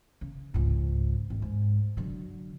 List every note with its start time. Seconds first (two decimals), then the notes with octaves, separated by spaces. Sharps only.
0.21 C#3
0.54 C#2 G#2
1.30 G#1
1.42 G#2
1.97 D3 F#3